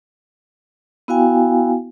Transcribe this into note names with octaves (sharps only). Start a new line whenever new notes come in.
B3 E4 F#4 F5 G5 G#5